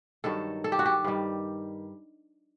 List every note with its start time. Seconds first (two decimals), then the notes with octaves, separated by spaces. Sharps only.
0.24 G2 D#3 F#3 A4
0.64 A4
0.72 G4
0.79 F#4
0.86 G4
1.04 G2 D#3 G3